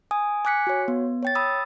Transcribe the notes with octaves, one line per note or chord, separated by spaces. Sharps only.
G#5 D#6
G#5 D6 F#6 B6 C#7
F#4 C#5
B3
C#5 G5 A6
B5 D#6 E6